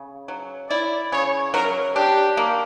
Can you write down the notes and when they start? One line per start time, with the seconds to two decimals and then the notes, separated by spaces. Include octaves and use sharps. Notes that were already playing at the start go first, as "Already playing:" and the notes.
Already playing: C#3
0.28 F#3
0.70 E4 D5
1.12 C#3 C#5
1.54 F#3 A#4
1.96 D4 G4
2.37 A#3